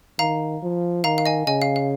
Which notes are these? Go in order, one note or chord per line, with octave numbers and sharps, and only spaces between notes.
D#3 F5 A#5
F3
D#3 F5 A#5
F5
D#5 G#5
C#3 D#5 G#5
F5
F5